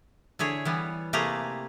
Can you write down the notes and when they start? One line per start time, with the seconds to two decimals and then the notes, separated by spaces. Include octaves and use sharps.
0.39 D3 E4 G#4 C#5
0.65 E3 G3 B3
1.13 C3 A3 A#3 G4 G#4 A#5